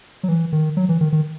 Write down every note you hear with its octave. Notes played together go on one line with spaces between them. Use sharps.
F#3
E3
D#3
F#3
E3
D#3
D#3